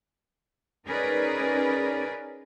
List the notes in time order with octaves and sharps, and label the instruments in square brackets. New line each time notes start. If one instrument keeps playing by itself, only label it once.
[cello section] C#4 D#4 G#4 A#4 B4 D5